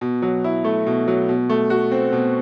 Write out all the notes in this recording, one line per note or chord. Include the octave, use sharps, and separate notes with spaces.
B2
F#3
E4
A3
B2
F#3
B2
A3
F#4
C4
B2